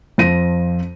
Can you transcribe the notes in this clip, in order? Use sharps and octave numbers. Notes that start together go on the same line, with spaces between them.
F2 F3 A#6 D#7